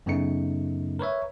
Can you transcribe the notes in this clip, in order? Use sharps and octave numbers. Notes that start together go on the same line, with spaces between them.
F#2 C#3 A3 B3 D#4 C#7
A#4 B4 C#5 E5